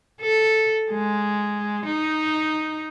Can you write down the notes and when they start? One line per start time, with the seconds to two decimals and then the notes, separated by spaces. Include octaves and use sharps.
0.21 A4
0.91 G#3
1.85 D#4